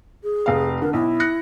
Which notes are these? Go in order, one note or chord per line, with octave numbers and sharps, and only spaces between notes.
G#4
F1 F5
D3 A#4
B1 E4
F#6 A#6 C#7